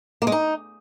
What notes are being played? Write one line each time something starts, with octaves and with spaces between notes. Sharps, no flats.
A#3
G#3
D#4